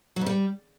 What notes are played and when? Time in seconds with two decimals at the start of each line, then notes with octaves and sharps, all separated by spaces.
0.16 F#3
0.21 F2
0.26 G3